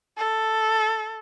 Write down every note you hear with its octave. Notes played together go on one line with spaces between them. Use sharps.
A4